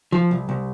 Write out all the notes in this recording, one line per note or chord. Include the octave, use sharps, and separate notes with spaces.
F3
C2
C2